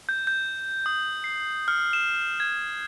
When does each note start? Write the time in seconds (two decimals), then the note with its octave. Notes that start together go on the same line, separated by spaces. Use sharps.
0.09 G6
0.27 G6
0.86 D#6
1.24 C7
1.68 F6
1.93 E7
2.40 G#6